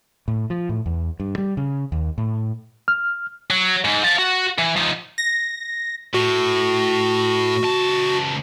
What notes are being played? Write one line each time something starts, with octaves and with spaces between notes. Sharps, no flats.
A2
F3
A2
E2
G2
G3
C#3
D#2
A2
F6
F#3
G#2
F5 A5
F#4
E3
F3 D#4
A#6
A2 F#4
C#2 A5